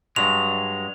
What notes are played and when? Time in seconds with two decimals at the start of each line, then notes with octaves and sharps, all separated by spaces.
0.16 G2 F#3 G#3 F7